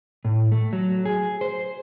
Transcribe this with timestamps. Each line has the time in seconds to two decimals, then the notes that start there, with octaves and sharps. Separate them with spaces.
0.25 A2
0.52 A3
0.73 F#3
1.05 G#4
1.41 C5